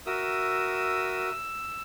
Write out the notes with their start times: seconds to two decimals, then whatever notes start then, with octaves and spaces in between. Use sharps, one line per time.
0.06 F#4 A#4 E5 D#6 E6
1.30 E6